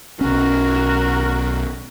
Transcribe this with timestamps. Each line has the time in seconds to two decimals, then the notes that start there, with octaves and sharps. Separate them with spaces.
0.21 B1 C#4 F#4 A#4